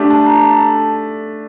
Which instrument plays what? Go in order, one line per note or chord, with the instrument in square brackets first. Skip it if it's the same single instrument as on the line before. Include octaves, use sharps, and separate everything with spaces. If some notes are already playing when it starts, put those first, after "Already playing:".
Already playing: [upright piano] A3 D4 G4
[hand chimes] A5
A#5
A5